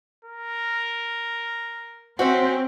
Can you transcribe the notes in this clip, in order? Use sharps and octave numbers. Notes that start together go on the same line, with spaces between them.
A#4
C4 C#4 F#4 C5 E5